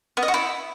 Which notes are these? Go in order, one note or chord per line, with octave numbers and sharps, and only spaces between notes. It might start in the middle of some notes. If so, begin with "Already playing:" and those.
B3
D#5
F#4
E4